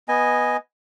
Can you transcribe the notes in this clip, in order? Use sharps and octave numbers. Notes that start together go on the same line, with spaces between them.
B3 D#5 G#5